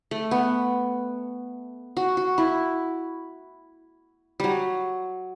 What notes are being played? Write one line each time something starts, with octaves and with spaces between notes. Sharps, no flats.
A3
B3
F#4
F#4
E4
F#3 G3